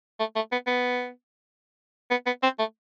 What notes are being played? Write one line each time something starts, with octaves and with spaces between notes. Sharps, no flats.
A3
A3
B3
B3
B3
B3
C4
A3